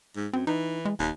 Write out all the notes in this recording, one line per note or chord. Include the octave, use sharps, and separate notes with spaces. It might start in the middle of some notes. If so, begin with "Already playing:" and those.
G#2
F#2 C4
E3 D#4
G#3
D#1 D#2